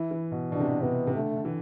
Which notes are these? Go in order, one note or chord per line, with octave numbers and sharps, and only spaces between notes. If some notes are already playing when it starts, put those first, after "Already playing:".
Already playing: E3 E4
E3
B2
B2 D4
C3
B2
C3 B3
C3
D3 A3
D3
E3